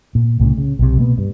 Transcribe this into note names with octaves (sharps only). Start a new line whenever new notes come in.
A#2
C2 A2 C#3
C#3
B1 C3
B2 A#3 B3
G2